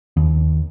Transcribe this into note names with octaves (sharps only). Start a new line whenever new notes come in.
D#2